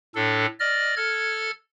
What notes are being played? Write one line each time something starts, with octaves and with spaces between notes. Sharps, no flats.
A2 D4 A4
D5 D#5 F6
A4 F6 G#6